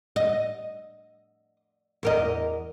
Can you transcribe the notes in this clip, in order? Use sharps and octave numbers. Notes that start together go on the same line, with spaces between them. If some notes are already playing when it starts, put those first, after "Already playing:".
D#5
E2 A#4 D#5